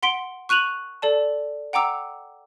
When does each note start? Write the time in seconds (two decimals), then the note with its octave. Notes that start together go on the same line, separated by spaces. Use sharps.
0.03 F#5 C6 B6 D7 G7
0.49 C#6 F#6 D#7 F7 F#7
1.02 A4 D5 A5
1.73 F#5 G5 A#5 D6 E6 F7